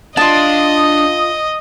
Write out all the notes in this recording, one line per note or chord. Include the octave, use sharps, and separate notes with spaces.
D4 F4 D#5 A5 D#6